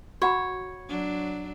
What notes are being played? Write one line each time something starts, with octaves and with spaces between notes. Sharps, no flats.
F#4 C#5 F#5 B5
F#3 D4